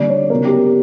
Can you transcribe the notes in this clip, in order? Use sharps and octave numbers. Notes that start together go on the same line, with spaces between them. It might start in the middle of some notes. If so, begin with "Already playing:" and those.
Already playing: D3 G3 A#3 D5
C#5
C#3 F#3 B3 A#4
G4